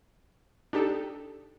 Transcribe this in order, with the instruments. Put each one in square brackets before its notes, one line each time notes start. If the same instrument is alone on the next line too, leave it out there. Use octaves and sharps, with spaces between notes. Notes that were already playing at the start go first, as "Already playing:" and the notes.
[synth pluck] D4 D#4 G4 A4